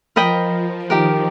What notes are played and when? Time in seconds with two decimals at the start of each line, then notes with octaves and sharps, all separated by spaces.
0.16 F3 A#4 D#5 G5 B5
0.90 D#3 D#4 G4 A#4